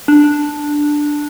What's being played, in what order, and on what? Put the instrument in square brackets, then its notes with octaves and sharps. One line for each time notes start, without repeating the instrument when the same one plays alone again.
[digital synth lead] D4